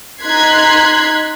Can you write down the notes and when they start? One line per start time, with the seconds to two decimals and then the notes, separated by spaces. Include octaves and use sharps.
0.22 D#4 C6 F#6 G#6 B6 C7